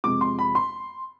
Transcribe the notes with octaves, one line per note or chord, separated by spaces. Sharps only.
F2 C3 F3 G#3 D6
C6
B5
C6